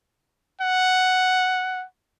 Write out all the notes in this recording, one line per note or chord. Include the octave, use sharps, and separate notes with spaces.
F#5